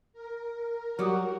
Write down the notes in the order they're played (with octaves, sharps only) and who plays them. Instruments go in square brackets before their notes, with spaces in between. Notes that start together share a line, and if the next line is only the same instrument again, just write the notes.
[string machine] A#4
[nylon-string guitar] F#3 G3 [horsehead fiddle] F#4 [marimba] G4 D6 D#6